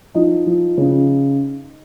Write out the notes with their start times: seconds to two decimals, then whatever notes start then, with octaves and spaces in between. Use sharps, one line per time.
0.15 F3 D#4 D#5
0.46 F3
0.78 C#3